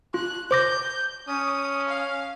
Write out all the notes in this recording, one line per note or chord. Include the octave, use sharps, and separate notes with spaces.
F4 F#6
C5 D6 G6 A#6
C#4 D#6
F5